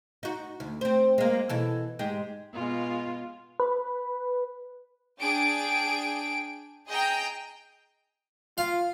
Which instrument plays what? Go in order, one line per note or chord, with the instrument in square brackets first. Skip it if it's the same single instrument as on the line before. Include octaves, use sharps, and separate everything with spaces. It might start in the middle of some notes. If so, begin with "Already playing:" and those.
[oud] D#4 F#4
D2
C4 C5
G#3 A#3
B2 E3 A4
G#2 G#3 G4
[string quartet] B2 G#3 [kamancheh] F4
[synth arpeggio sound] B4
[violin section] D4 G#4 G5 D7
G#4 D#5 G5 A#5 G6
[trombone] F4 [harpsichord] F5